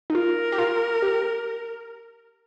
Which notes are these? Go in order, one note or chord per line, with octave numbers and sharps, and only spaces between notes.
D#4
F4 A#4
G4
F4
G4